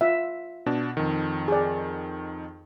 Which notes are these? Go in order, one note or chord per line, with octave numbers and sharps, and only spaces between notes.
F4 E5
B2 D4
F2 D#3
G#4 D5